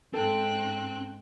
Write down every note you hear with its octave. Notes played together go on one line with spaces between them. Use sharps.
G#2 C4 A4 G5 F#6